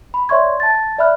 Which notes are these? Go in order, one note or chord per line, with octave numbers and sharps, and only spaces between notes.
B5
C#5 D5 E5 C6 C#6 G#6
A5 A6
D5 E5 B5 F6 F#6